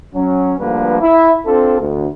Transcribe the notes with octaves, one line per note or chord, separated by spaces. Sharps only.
F#3 C#4
D2 D3 F3 G3 A#3 B4
E4 E5
C4 D4 F4 A4
D2